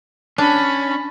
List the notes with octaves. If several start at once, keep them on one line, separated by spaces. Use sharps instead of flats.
C#4 D4 A5 B5